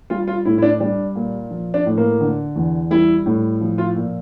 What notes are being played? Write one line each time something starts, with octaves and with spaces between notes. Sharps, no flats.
G3 F4
F4
A2 E4
E4
D4
G3 D4
A#2
F3
D4
A2
A#3
D3
E2
G3 E4
A2
F3
F4
A#2